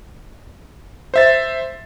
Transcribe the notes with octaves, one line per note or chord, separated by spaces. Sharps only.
C5 E5 A6